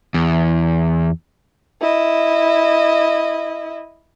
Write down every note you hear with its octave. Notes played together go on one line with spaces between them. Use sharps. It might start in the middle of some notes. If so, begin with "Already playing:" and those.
E2
E4 D#5